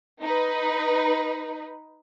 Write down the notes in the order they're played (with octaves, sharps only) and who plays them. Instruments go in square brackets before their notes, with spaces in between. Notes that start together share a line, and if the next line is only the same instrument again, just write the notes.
[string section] D#4 B4